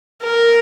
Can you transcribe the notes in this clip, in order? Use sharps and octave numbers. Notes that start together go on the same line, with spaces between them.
A#4